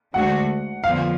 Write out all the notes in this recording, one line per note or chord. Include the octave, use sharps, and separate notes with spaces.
D2 D3 G#3 D4 F#4 F#5
F2 D3 F3 B3 F5